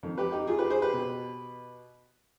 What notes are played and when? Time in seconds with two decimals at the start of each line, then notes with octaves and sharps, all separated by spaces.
0.03 F2 D#3
0.18 G4 B4
0.32 D#4 G4
0.47 F4 G#4
0.59 G4 B4
0.70 G#4 C5
0.82 G4 B4
0.93 B2